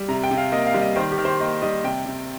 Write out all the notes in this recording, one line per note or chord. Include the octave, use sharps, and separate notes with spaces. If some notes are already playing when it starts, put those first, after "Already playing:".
Already playing: G3
C3 A#5
G5
C3
F5
A#3 D#5
F5
G3
D#5
D#3 C5
G4
D#3
C5
A#3 D#5
G3 D#5
C3 G5
C3